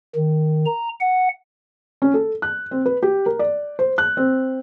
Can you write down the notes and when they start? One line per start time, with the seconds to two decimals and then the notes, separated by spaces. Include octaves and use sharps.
0.15 D#3
0.66 A#5
1.00 F#5
2.02 C#4
2.14 A4
2.42 F#6
2.71 C4
2.86 B4
3.03 G4
3.26 A#4
3.39 D5
3.79 C5
3.98 F#6
4.17 C4